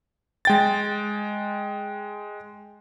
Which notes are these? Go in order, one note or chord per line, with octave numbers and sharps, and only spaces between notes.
G#3 G5 A6